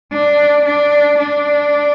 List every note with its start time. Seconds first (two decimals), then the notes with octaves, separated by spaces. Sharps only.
0.13 D4
0.65 D4
1.19 D4